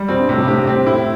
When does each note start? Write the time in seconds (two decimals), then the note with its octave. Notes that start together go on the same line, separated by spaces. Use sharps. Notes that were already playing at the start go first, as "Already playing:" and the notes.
Already playing: G3
0.08 B2 C4
0.19 G2
0.29 A2 C3
0.38 B2
0.43 G2
0.48 A2 G4
0.57 G2
0.67 A2 C4
0.86 A2 E4